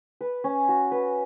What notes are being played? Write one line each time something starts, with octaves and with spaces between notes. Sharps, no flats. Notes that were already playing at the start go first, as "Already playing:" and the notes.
B4
C#4
F#4
B4